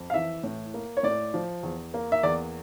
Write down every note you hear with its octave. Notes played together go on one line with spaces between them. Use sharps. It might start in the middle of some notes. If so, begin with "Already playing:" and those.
Already playing: F2
F5
E3 E5
A2
A#3
C#5
A2 D5
F3
E2
A#3
E5
E2 D5